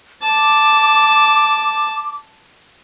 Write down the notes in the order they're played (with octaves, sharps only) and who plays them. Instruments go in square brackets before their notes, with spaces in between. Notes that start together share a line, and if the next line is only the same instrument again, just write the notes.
[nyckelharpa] A5 [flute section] D6